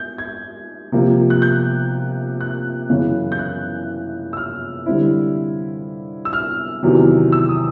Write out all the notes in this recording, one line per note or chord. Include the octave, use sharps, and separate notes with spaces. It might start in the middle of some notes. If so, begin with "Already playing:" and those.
Already playing: G6
G#6
C3 F3 A#3
F#6
G6
F#6
F#2 C#3 E3
G6
F#6
E6
F6
D3 G3 C4 E4
E6
F6
E2 C3 D#3 F#3
E6
D#6